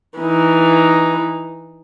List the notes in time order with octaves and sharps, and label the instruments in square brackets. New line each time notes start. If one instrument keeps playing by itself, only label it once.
[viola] E3 D#4